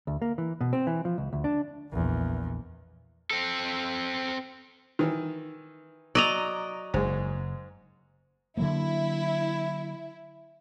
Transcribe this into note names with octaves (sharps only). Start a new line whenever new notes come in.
D2
A#3
E3
B2
C4
E3
F3
C#2
D2
D4
A#1 E2
C4 A4
D#3 E3
F#3 D5 D#5 G#5 A#5
F#1 G#2 G#3
D3 F#3 A#3 E4